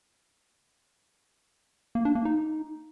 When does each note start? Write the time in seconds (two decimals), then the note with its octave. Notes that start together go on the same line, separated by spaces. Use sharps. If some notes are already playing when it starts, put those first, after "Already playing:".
1.95 A#3
2.05 D4
2.15 A#3
2.25 D#4